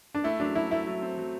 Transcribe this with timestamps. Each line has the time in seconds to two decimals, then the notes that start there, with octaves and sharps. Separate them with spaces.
0.15 D4
0.24 A3 E4
0.40 F#3 D4
0.55 F#3 E4
0.71 A3 E4
0.87 F#3
1.02 C4
1.18 F#3